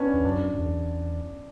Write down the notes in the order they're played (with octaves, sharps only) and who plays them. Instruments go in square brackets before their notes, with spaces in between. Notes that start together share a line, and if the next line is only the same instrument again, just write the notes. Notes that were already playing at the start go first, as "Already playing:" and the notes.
Already playing: [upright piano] B3 C#4 D4
[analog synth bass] E2
[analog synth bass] F#2 [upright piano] D4
[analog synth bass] F#2
E2